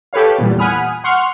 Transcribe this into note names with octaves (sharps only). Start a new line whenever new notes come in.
G4 A4 B4 C#5 F5
E2 A#2 G3
F#5 G#5 B5 D#6 F6
F#5 C6 C#6 F6